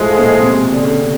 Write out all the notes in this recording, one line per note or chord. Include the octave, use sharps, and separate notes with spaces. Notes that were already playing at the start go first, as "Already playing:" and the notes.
Already playing: A2 F3 G#3
A#2
C3
B2
D3
C#3
C3